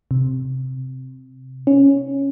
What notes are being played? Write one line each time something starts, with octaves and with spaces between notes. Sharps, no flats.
C3
C#4